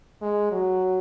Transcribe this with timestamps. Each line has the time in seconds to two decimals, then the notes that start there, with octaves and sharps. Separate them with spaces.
0.21 G#3
0.52 F#3